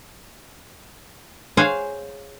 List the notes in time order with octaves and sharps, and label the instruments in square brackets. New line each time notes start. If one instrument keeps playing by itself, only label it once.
[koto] G#4 C5 C#5 F5 F#5 G#5